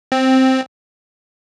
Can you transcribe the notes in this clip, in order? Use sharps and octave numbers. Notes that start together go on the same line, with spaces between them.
C4